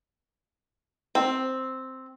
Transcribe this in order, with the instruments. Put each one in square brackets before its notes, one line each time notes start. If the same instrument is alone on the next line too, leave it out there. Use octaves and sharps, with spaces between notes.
[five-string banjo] C4